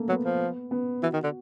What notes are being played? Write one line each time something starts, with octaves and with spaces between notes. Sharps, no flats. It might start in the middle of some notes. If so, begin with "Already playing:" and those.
Already playing: A3 A#3
F#3 B3
F3
B3
E3 F#4
D#3
D3